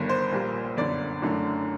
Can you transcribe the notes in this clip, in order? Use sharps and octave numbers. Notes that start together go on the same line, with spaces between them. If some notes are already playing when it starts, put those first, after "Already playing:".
Already playing: G1 G2 D#3
C5
A#1 A#2 G3 A#3
G1 F#2 D3 D5
F#1 F#2 D3 A3